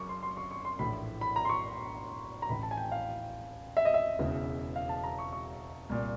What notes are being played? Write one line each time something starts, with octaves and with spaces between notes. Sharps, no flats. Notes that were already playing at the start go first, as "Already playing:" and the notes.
Already playing: F#1 F#2 C#6 D6
C6
C6
C#6
C#6
C6
A#1 A2 E3 B5
B5
A#5
C6
C#6
A#5
A1 A2 E3 B5
A5
G#5
G5
F5
E5
D#5
E5
E1 E2 C#3 E3
F5
A5
A#5
C#6
C#6
C2 A#2